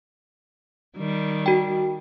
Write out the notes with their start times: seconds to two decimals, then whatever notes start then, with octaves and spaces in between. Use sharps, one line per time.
0.97 D#3 G3
1.46 F#4 G5